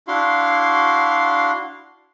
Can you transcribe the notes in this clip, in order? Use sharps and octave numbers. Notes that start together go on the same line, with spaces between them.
D4 E4 F#4 F5 C6